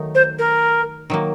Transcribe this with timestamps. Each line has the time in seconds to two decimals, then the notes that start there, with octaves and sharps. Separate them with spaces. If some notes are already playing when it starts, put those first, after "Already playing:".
Already playing: D#3 F#3 A3 D#4
0.15 C5
0.39 A#4
1.10 D#3 F#3 A#3